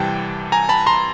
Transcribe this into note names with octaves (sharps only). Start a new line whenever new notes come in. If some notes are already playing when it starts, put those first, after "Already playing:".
Already playing: C2 C3 E3 G3 G5 A5
G#5 A#5
A5 B5
A#5 C6